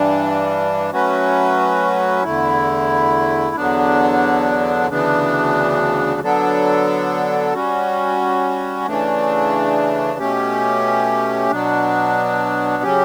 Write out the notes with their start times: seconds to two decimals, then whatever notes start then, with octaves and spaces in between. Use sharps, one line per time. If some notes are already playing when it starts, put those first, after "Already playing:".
Already playing: G2 E3 G3 D4
0.91 F#3 A3 C#4 F#4 B4
2.24 E2 D3 A3 E4
3.56 E2 D3 F#3 B3 D4
4.88 D2 C#3 E3 B3 D4
6.21 D3 F#3 B3 D4 A4
7.53 G3 C#4 F#4
8.85 C#3 E3 A3 D4
10.19 B2 A3 C#4 G4
11.51 B2 F#3 B3 D4
12.83 C#3 F#3 C#4 G4